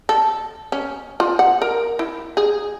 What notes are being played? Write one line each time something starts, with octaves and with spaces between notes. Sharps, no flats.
A4
C#4
F4
F#5
A#4
E4
G#4